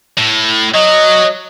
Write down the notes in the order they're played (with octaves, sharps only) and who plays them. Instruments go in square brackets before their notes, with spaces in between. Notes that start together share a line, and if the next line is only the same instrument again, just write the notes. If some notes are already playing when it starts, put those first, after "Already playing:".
[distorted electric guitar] A2
[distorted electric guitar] F#3 [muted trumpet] D#5